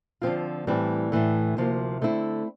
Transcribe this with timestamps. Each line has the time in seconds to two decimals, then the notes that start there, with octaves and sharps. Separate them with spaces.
0.22 D3 F3 C4 F4
0.67 A2 E3 G3 C4
1.12 A2 E3 A3
1.57 D2 C3 F3 A#3
2.02 D3 A3 C4 E4